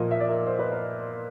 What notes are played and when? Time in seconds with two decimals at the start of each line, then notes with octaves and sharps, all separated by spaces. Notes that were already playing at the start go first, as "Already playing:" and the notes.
Already playing: A#2 F3 A#3 D#5
0.11 E5
0.20 D5
0.29 A#4
0.47 C5
0.59 B4
0.71 A#4